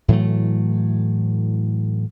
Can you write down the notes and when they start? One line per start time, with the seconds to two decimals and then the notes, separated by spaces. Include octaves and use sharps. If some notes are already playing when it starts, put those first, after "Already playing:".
0.08 A2 E3 F#3 A3